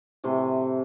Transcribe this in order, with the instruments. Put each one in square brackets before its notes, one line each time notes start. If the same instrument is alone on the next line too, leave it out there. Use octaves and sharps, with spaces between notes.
[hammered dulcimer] A2 C3 E3 C6